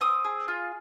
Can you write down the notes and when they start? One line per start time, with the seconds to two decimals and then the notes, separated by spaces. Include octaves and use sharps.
0.01 C4 D#6
0.24 G#4
0.48 F4